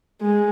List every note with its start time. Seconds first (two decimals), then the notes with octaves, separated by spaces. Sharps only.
0.21 G#3